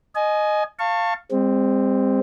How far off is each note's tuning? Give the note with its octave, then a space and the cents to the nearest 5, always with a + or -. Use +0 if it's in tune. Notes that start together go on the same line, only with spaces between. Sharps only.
D#5 -10 G#5 +25
F5 +0 A5 +25 C#6 -15
G#3 -40 C4 +0